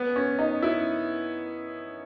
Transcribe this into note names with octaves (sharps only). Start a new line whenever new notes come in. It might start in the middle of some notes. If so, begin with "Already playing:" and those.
Already playing: B3
C#4
D#4
E4